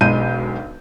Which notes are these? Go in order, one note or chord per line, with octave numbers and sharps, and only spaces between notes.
E1 B1 G#3 G6 D#7